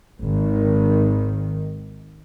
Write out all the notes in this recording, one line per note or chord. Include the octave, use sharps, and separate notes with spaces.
G#1 D#3